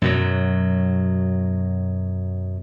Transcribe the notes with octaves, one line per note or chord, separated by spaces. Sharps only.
F#2 B2 F#3